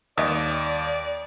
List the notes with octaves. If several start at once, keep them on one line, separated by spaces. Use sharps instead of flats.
D#2 D5 D#5 D#6